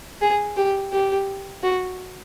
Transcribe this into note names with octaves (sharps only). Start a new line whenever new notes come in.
G#4
G4
G4
F#4